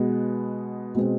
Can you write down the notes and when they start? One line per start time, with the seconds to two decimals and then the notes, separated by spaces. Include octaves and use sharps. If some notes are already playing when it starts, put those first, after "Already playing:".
Already playing: B2 G#3 B3
0.95 B2 G#3 C4